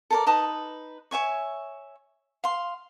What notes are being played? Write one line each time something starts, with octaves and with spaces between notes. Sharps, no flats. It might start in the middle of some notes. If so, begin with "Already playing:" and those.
A4 A#4 D5
D#4 B4 A5 D#6
C#5 E5 G#5 C#6
F5 C6